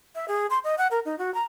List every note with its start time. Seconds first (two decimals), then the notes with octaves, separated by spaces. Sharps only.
0.15 E5
0.28 G#4
0.50 C6
0.64 D#5
0.78 F#5
0.91 A#4
1.05 D#4
1.18 F#4
1.34 A#5